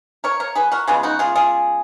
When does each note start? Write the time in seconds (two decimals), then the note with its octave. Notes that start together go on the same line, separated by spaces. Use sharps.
0.24 A#4 C#5
0.40 A#4 C#5
0.55 G#4 B4
0.72 F#4 A#4
0.88 C#3 G#3 B3 F4 G#4
1.03 D#4 F#4
1.19 F4 G#4
1.36 F4 G#4